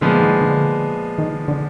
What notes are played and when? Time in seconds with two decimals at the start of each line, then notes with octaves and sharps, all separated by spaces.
0.01 A#2 D3 F3 G#3 B3
0.21 D#3
0.41 D3
1.18 D#3
1.48 D3